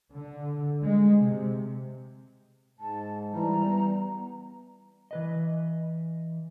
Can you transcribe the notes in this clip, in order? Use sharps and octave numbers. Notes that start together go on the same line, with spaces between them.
D3
G#3
C3
G#2 A5
E3 G3 A#5
B3
E3 B4 D#5